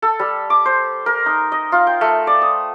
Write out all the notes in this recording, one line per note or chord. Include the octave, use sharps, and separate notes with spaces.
A4
G3
D6
C5
A#4
D#4
D#5
F4
G5
A3
D5
D#6